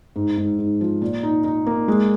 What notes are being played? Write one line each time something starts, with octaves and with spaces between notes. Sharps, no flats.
G#2
G#2
G#2
F3
A#2
D#4
D#4
A#3
G#3